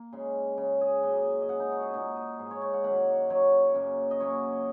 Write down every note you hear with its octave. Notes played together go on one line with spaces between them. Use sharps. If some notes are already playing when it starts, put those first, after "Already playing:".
Already playing: A#3
C#3 G#3
C#3 G#3
G#4
F#2 C#3 A#3 D#5
G#5
D#5
C#3 G#3 F#5
D#4
F#4
G#4
A#2 A#3 D#4
D#4
G#2 G#3
C#5
C#5
F#5
F#2 D#3 F#3 A#3 F#5
C#3 F#3 A#3 C#5
F#2 C#3 A#3
D#5
C#3 F#3 A#3 C#5